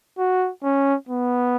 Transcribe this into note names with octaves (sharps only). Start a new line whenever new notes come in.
F#4
C#4
B3